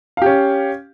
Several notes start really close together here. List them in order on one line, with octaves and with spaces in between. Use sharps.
F5 G4 C#4